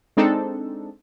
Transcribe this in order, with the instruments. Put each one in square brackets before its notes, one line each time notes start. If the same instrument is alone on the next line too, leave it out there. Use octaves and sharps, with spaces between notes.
[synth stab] G#3 C4 D4 D#4 A4